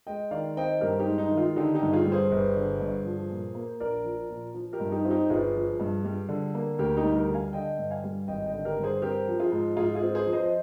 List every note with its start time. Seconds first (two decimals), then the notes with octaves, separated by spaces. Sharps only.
0.07 G#3 D#5 G5
0.31 D#3 D5 F5
0.57 C4 D#5 G5
0.81 G2 G4 A#4
1.00 D#4 G4
1.07 G#3
1.18 D#4
1.31 D#3
1.37 F4
1.56 D3 D#4 G4
1.74 D#4 G4
1.82 G2
1.93 F4 G#4
2.05 G3
2.12 G#4 C5
2.31 G1
2.56 D3
2.80 G2
3.05 F3
3.30 A#2
3.55 A#3
3.80 A#1 A#4 D5
4.04 F3
4.29 A#2
4.54 F3
4.73 G4 A#4
4.80 G2
4.92 D#4 G4
5.05 C4 F4
5.10 D#4 G4
5.30 G1 F4 G#4
5.55 F3
5.80 G2
6.04 G3
6.29 D3
6.54 A#3
6.78 D2 G4 A#4
6.97 D#4 G4
7.04 G3
7.16 G4 A#4
7.29 D3
7.34 F5 G#5
7.53 D3 D#5 G5
7.78 G2
7.91 F5 G#5
8.04 G3
8.28 G#1 D#5 G5
8.46 D#5 G5
8.53 D3
8.65 G4 A#4
8.78 G2
8.83 G#4 C5
9.02 C4 G4 A#4
9.28 F3
9.40 F4 G#4
9.52 G#2
9.77 G#2 F4 G#4
9.95 F4 G#4
10.03 C4
10.15 G#4 C5
10.27 F3
10.33 C5 D#5
10.43 D#5